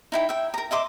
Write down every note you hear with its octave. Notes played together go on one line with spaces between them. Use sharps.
D#4 E4 G5
E5 G5
A#4 A#5
D#5 E5 C6 D6